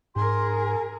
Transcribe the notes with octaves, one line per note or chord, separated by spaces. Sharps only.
G#2 G#4 A#4 C6
G#5